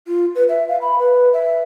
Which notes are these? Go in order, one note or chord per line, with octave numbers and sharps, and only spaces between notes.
F4
B4
E5
F5
B5
B4
E5